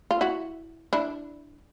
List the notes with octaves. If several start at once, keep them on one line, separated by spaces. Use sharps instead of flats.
F4
E4 F#4
D4 E4